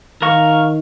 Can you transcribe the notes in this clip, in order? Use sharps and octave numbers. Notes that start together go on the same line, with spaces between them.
D#3 A#4 F5 C#6